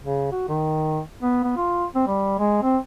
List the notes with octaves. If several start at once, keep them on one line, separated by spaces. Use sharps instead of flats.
C#3
F#4
D#3
B3
B3
F4
C4
G3
G#3
C4